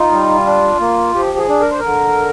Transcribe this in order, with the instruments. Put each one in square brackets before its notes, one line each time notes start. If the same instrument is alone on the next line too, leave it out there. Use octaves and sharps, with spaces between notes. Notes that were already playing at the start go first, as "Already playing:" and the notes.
Already playing: [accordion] D#4 F4
G3
D4
A#3
F3 G4
G#4
D4
A#4
C5
D3 A#4